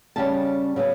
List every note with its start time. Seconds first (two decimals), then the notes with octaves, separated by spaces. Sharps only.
0.16 C#3 G3 C#4 A5
0.76 C#3 F#3 B3